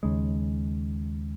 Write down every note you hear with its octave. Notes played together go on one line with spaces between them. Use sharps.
D#2 C#3 G#3